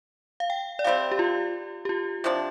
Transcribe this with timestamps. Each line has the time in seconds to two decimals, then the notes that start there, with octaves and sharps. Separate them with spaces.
0.40 F5
0.50 G5
0.79 D5
0.84 C3 G3 C4 F5
1.11 G4
1.19 F4
1.85 G4
1.89 F4
2.24 C3 F3 D4